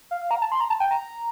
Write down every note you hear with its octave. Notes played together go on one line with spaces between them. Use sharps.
F5
F5
A#5
A5
C6
A#5
A5
G5
A#5